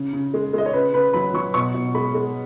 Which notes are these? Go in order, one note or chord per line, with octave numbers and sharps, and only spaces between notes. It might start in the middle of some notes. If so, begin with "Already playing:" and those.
Already playing: C#3
C#3
G#3
G#3 D#5
C#5
C#3 B4
C#3 B4
F#3 B5
F#3 C#6
B2 C#6
B2
G#3 B5
G#3